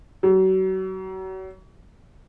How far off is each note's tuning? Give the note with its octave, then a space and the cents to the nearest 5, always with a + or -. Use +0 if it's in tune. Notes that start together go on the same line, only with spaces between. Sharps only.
F#3 +35